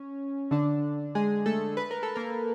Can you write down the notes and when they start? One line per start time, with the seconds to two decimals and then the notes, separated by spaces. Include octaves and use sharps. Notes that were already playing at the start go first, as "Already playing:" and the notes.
Already playing: C#4
0.51 D3 D4
1.15 G#3 G#4
1.46 A3 A4
1.77 B4
1.91 A#4
2.03 A4
2.15 A#3 A#4